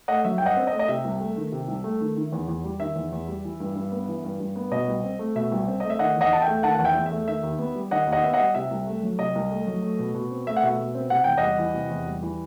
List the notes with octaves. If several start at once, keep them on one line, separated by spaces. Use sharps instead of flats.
A3 D#5 F#5
F#3 E5
G5
G2
D#5 F#5
C4
D#5
A3
D#5
C3 E5
C2
A3
D#3
C3
C2
A3
D#3
D#3
E2
E2
G3
D#3 E5
E2
E2
G3
E3
G2
G2
B3
E3
G2
G2
B3
B2 D#5
C2
C4
A3
B2 E5
C2
C4
A3 D#5
E5
D#3 D#5 F#5
E2
D#5 F#5
E2 A5
E5 G5
A3
D#3 F#5 A5
E2 F#5
E5 G5
E2
E5
A3
D#3 E5
D#2
B3
G3
D#3 D#5 F#5
D#2
D#5 F#5
B3 E5
D#5 F#5
G3
C3 E5
C2
A3
F#3
C3 D#5
C2
A3
F#3
A3
B2
B2
C4
A3 E5
F#5
B2 E5
B2
C4
C3 F#5
E2 G5
G3 D#5 F#5
E3
C3
E2
G3
E3